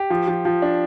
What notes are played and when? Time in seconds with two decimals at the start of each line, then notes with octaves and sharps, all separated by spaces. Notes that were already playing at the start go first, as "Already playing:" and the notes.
Already playing: G4
0.10 F3
0.28 F3
0.45 F3
0.62 D4